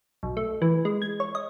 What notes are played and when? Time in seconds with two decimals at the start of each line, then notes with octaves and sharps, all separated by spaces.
0.23 B1
0.37 A3
0.62 E3
0.85 G#3
1.02 G#6
1.20 C#5
1.35 D#5